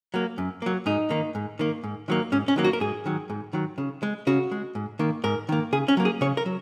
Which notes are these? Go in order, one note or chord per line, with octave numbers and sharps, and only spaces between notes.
F#3 A#3
F#2
F#3 A#3
G#2 D#4
D#3 A#3
G#2
D#3 A#3
G#2
D#3 F#3 A#3
G#2 C#4
C#4
D#3 F#3 A#3
F#4
A#4
G#2 G#4
D#3 F#3
G#2
D#3 F#3
C#3
G#3
C#3 F#4
G#3
G#2
D#3 A#3
G#2 A#4
D#3 A#3
C#3 G#4
C#4
F#3 A#3
G#4
C#3 C#5
A#4
F#3